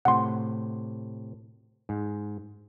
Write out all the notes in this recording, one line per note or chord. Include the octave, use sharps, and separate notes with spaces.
A2 C3 F#5 C6
G#2